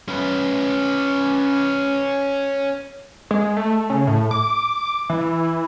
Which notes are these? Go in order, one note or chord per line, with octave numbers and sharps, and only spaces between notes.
C#4 B4
G#3
A3
C#3
A2
D6
E3